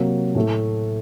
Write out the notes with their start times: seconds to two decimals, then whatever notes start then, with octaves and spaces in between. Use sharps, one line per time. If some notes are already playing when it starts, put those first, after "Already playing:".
Already playing: C3 F#3 A#3
0.35 A2 A3